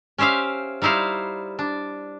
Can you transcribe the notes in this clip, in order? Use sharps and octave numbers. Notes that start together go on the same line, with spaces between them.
C#4 G4 C5 E5 F5
G3 D#4 E4 C5 F5
D4